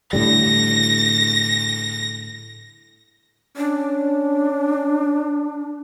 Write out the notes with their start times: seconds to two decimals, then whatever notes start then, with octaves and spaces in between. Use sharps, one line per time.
0.13 A2 D3 G3 A#6
3.57 C#4 D4